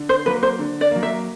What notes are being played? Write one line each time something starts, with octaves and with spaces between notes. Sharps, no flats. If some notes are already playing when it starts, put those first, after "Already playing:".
Already playing: D3
C5
F#3 A#3 B4
C5
D3
D5
F#3 A#3
E5